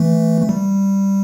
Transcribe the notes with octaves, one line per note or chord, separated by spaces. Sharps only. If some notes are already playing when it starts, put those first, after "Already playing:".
Already playing: E3 A3
A3
G3